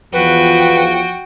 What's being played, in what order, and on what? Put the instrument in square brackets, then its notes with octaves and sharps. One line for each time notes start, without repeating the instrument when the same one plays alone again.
[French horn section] E2 F3 [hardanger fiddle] F#4 G5 [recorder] B4